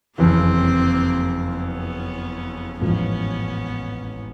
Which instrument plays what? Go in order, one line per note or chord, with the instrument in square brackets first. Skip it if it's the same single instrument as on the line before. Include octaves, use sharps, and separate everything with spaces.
[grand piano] F#1 F2 C#3 E3 [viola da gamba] A#3 C4
[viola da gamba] B3 C#4
[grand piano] A1 G#2 F3 [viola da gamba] B3 C#4